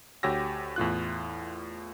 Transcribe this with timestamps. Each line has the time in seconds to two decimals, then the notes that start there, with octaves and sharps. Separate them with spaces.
0.23 D2 F#4 G4 C#5 E6 A#6
0.76 E2 A2 F4 F#6